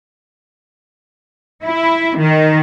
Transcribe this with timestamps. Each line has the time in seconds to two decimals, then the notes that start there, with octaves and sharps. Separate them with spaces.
1.63 E4
2.18 D#3